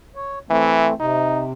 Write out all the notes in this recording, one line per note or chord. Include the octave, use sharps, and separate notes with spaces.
C#5
E3 A3 C4
C3 D#4